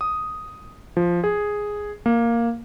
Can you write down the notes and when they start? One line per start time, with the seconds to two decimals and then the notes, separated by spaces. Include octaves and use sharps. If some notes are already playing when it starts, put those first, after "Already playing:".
0.01 D#6
0.97 F3
1.24 G#4
2.06 A#3